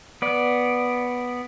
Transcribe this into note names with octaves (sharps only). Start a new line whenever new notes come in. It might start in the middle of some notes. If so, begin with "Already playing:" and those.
B3 D5